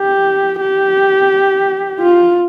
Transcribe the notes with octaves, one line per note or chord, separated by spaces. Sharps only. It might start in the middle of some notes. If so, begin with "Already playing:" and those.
Already playing: G4
G4
F4